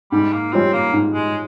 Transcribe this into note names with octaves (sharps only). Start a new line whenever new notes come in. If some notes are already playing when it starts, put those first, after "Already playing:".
G#2 G3
A#3
G3 C4 C#4 F4
A#3
G#2
G#3